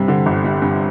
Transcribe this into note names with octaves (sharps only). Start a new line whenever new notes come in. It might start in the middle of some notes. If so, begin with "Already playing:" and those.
Already playing: G2 C3 G3
D3
G1
G3
G2